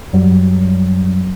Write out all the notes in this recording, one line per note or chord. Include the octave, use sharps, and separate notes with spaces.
F#2 F#3 G3